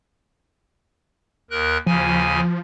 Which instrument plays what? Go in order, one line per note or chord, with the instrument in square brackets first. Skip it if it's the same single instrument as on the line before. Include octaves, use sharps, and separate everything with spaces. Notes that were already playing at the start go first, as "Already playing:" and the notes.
[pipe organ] D#2 A#4 F#6
[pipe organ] D#2 C#3 G#5 [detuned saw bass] F3